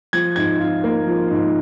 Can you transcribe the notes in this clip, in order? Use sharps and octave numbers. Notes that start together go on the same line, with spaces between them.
F3 G#6
G#2 G#6
F4
A#3
F3
G#2